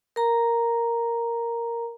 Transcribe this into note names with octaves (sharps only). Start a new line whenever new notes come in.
A#4 A#5